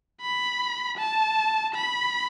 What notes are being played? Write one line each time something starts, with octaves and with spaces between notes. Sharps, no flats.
B5
A5
B5